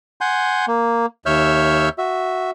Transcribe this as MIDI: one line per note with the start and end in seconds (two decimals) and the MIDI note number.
0.21 0.66 78
0.21 0.66 80
0.21 0.66 84
0.21 0.66 91
0.68 1.06 58
1.26 1.89 39
1.26 1.89 73
1.26 1.89 76
1.26 1.89 88
1.26 1.89 89
1.26 1.89 91
1.98 2.51 66
1.98 2.51 76